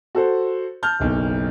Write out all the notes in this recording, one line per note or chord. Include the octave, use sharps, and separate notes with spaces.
F#4 A4 C5
A5 F6 G6
F#1 B1